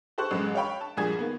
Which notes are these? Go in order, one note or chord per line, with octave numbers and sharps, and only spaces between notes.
G4 A4 C5 C#6 F#6
A1 F#2 G#3
C#5 F5 G5 B5 C#6
A5
C2 G2 A#2 F3 G#4 G#6
D#3 A#3 B3